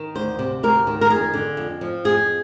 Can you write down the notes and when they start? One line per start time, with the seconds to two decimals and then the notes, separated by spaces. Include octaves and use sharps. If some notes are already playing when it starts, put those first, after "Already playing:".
Already playing: D#3
0.15 D2 C5
0.39 C3
0.63 D2 A#4
0.87 D#3
1.01 A#4
1.10 F2 G#4
1.34 D3
1.57 F2
1.81 F3
2.05 F2 G#4